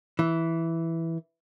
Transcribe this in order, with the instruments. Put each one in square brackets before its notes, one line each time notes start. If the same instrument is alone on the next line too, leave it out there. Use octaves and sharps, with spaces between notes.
[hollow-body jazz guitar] E3